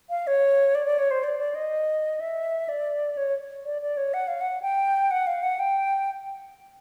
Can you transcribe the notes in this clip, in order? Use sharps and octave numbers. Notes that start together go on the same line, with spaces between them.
F5
C#5
D5
D5
C#5
C5
D5
D5
D#5
E5
D5
C#5
D5
D5
C#5
F#5
F5
F#5
G5
F#5
F5
F#5
G5